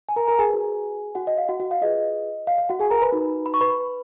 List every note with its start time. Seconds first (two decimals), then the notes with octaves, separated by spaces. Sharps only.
0.09 G#5
0.16 A#4 A#5
0.28 A#4 A#5
0.39 G#4 G#5
0.49 F#4 B4
1.15 F#4 F#5
1.27 D#5
1.38 F5
1.48 F#4 F#5
1.60 F#4 F#5
1.71 F5
1.81 F4 G#4 B4 D#5
2.47 F5
2.58 F5
2.69 F#4 F#5
2.80 G#4 G#5
2.91 A#4 A#5
3.02 B4 B5
3.12 D#4 F#4 B4
3.46 B5
3.54 C#6
3.61 B4 B5